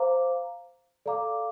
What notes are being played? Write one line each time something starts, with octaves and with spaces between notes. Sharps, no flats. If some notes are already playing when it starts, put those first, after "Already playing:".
Already playing: C5 F5 A#5 D6
A4 D5 F5 A#5 D6